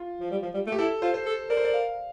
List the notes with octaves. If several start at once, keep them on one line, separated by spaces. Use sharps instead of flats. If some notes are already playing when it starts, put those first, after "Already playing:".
Already playing: F4
F3
G3
F3
G3
A3
G4
E4 A4
F4 C5
C5
A4
A#4 D5
C5
D5
F5